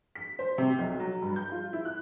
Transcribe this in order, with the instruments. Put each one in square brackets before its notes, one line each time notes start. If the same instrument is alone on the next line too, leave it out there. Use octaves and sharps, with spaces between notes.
[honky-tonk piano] B6
C5
C3
B1
F#3
G2
G6
F4
E4
F#6